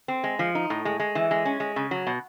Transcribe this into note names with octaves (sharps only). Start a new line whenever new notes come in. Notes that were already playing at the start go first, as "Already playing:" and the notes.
C4
G#3
F3
D#4
A2
G#3
G#3
E3
G#3
C#4
G#3
C#3
F#3
B2